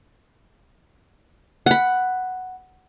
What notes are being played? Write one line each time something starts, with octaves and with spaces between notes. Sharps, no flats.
F#5 B5